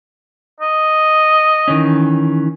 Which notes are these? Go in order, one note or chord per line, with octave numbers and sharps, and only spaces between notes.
D#5
D#3 E3 C#4